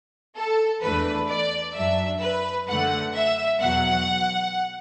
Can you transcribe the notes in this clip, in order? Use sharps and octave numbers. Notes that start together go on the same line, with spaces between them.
A4
E2 E3 A3 D4 B4
D5
F#2 F#3 D4 E5
B4
F#2 D3 A3 F#5
E5
E2 B2 F#3 F#5